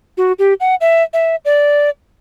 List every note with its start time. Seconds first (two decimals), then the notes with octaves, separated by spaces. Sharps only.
0.18 F#4
0.39 G4
0.60 F#5
0.81 E5
1.13 E5
1.45 D5